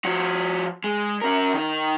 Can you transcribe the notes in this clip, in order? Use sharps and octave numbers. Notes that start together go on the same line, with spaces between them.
F3 F#4
G#3
C#4 A#4
D#3 D#4